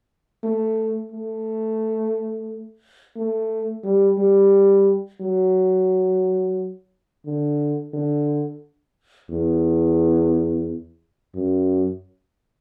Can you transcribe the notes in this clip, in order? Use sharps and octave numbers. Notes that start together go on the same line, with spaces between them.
A3
A3
A3
G3
G3
F#3
D3
D3
E2
F#2